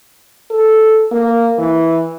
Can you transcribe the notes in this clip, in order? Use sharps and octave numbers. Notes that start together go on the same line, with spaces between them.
A4
A#3
E3